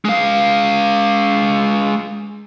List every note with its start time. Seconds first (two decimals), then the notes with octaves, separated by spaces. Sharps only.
0.05 G#3 F5